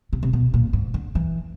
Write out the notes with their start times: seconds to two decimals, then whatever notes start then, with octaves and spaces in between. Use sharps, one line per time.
0.13 C3
0.23 C3
0.33 B2
0.54 A#2
0.73 G#2
0.94 D3
1.15 E3